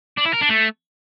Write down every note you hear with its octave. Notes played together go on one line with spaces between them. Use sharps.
D4
E4
A#4
D4
A3